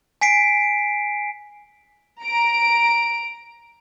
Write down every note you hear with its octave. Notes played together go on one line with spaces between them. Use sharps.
G#5 B6 C7 D7
A#5 D7